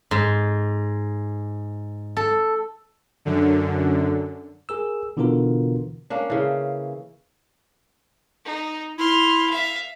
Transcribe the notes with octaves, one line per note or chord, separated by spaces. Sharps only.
G#2
A4
F#2 D3
G#4 A#4 E6
B2 D3 E3 B3 F4 A#4
A#3 C#4 D4
C#3 E3
D#4
E4 C6 F6
E5 F5